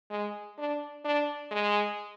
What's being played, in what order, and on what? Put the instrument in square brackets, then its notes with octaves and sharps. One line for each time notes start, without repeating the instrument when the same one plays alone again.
[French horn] G#3
D4
D4
G#3